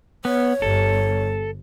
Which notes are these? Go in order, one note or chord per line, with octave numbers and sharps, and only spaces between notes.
B3 C#5
G1 A4